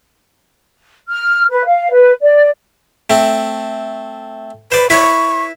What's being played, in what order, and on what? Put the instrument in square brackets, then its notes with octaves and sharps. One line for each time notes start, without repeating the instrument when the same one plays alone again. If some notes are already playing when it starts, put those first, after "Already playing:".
[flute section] F6
B4
F5
B4
D5
[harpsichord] A3 C4
[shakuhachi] B4 [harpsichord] C5 D5
[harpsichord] E4 B4 [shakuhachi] C#6